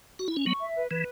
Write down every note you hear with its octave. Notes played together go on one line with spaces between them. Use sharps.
F#4
E4
C#4
F#3 B3 C#6
E5
B4
E3 B4